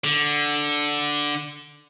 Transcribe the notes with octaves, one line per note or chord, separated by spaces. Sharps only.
D3